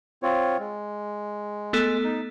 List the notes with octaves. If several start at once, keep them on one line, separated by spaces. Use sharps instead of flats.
C4 F4 C#5
G#3
A3 B3 A4
D#4